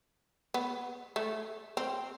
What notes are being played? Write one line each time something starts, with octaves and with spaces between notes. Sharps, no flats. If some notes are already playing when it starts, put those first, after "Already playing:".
B3
A3
C4